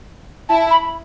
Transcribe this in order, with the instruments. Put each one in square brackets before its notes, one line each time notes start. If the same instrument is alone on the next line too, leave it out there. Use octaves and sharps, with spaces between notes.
[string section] E4 [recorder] A5
[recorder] B5